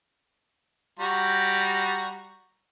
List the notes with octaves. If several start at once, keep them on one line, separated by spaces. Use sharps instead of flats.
G3 F#4 A#5